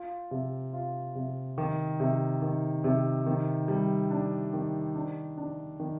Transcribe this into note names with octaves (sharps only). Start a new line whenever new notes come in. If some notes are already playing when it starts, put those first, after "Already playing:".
Already playing: F4
C3
F4
C3
D#3
C3
D#3
C3
D#3
G3
D4
D#3
D4
D4
D#3